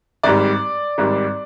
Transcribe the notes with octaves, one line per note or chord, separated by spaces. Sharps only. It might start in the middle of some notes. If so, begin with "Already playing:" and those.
G#1 G#2 G3 D5
G#1 G#2 G3